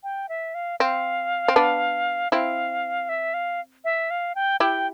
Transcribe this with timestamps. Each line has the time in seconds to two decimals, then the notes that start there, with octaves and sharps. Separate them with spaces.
0.03 G5
0.29 E5
0.54 F5
0.80 C4 F5
1.48 C4
1.56 B3 D4
2.32 C4 E4 F5
3.09 E5
3.34 F5
3.84 E5
4.10 F5
4.35 G5
4.60 E4 G4 G5